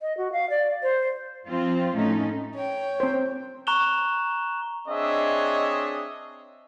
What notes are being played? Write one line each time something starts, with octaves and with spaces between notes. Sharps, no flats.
D#5
F#4
F5
D5
C5
F3 C4 F4
A2 A3 C#4 D#4
C#5 G5
C4 C5
A#5 C#6 F#6 E7 F7 G7
C4 D4 G#4 C#5 D#5 E5